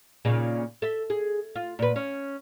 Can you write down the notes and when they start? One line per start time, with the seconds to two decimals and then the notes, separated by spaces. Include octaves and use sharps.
0.25 A#2 C#3 D#4
0.82 A4 E5
1.10 G#4
1.56 F4
1.79 A#2 B4
1.96 C#4